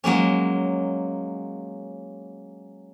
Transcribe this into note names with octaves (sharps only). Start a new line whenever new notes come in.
F#3 G#3 A#3 C#4